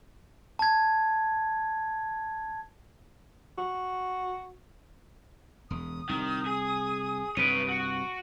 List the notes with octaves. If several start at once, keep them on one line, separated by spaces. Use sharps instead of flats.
A5 G#6
F#4
E1 D#6
C2 D#3
G#4
C2 G2 B4 C#5 D7 D#7
F#4